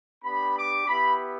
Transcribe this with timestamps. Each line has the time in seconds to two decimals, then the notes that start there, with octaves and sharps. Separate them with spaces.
0.24 B3 D4 G4 B5
0.55 D6
0.86 B3 E4 G4 B5